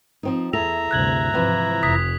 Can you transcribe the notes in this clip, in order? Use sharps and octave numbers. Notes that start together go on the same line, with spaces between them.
F3 C4 D#4
E2 E4 G#4 A4 E5 A#5 F7
D2 G2 C3 F#6 G#6 F#7
G#2 C3 E3 F3
F1 D#6 G#6 B6